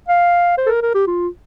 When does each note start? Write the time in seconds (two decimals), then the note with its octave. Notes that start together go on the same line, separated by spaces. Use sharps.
0.09 F5
0.58 C5
0.66 A4
0.70 A#4
0.82 A#4
0.95 G4
1.07 F4